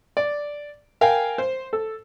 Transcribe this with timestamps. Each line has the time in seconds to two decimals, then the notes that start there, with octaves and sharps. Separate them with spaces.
0.17 D5
1.01 A#4 F5 G5 G#5
1.38 C5
1.73 A4